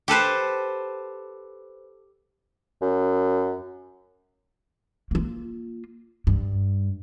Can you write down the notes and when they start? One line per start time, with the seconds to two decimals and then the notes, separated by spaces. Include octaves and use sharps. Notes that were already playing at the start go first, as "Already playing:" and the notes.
0.08 G4 A4 B4 C5
2.82 F#2
5.11 A#3 F4
6.27 G2